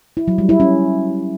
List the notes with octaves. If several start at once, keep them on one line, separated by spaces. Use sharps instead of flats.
E4
F#3
G3
E4
C#4